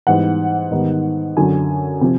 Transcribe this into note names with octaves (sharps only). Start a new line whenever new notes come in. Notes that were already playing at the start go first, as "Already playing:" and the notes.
G#2 E3 G3 B3 F#5
G#2 D#3 G3 B3 D#4
F#2 D3 F#3 G#5
C3 F3